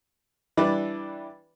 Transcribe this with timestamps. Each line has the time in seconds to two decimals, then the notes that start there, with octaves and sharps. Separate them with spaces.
0.57 E3 G3 D4 E4 B4 D5